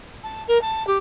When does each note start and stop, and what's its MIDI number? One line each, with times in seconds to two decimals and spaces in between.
0.23 0.43 81
0.48 0.60 70
0.61 0.85 81
0.87 0.97 67